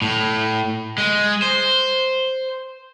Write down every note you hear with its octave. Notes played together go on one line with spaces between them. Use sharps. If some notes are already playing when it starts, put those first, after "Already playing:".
A2
G#3
C5